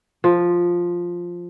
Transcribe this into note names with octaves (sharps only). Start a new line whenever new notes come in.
F3